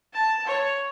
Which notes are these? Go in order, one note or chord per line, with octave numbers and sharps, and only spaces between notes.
A5
C#5